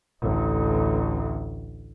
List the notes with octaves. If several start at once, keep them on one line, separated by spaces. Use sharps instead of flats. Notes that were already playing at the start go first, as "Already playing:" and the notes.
A1 D2